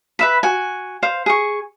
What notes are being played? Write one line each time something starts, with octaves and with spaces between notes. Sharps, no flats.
B4 E5 B5
F#4 G#5
C5 F5
G#4 C#6